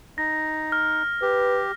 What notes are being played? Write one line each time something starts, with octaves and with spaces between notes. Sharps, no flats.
D#4 A#6
F6
G4 B4